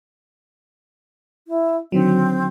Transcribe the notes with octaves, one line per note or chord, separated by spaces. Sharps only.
E4
D3 D#3 F#3 C4